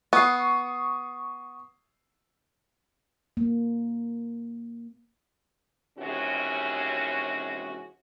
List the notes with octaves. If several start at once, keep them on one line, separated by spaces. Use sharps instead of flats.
B3 C#6 D#6 C7
A#3
D#2 C3 E3 G#3 C#4 F#4